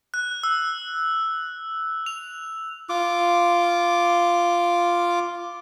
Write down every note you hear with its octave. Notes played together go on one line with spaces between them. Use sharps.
F#6
E6
F7
F4 D6